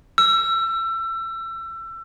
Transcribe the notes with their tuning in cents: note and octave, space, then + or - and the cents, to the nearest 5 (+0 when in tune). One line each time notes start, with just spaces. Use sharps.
E6 +30